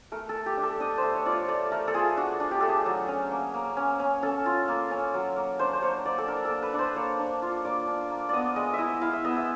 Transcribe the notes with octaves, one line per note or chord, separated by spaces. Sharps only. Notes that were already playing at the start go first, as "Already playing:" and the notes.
A3 A#4
A4
A3
G4
D4
A4
D4 D#5
C5
A3
C#5
F4 D5
C#5
A3 D5
A3 A#4
A4
F4 G#4
D4 F#4
D4
G4
A3 A4
G#4
F#3
C#4
A#3
A#3
C#4
C#4
C#4 A4
F4
A#3
C#4
F#3
A#3
D4 C5
C5
A#3 C#5
A#3 D5
A4
D4 A#4
A4
A#3
B4
D4
C5
A#3 C#5
D4
F4
A#3 D5
D4
A#3
B3 D5 D#5
G#3 D#5
E5
E4 D#5
E4 F5
E5
B3 D#5
E5